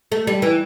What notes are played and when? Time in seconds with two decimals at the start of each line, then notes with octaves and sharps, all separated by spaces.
0.12 A3
0.27 G3
0.42 E3